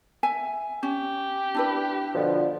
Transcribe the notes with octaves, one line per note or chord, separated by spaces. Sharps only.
E5 G#5
C#4 G4
D4 E4 B4
B2 D3 F3